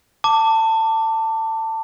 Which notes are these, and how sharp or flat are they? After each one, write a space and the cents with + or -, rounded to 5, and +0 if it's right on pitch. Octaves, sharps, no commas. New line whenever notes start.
A5 +20 D6 -5